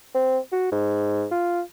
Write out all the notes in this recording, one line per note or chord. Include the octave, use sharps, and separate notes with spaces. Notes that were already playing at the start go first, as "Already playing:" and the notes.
C4
F#4
G#2
F4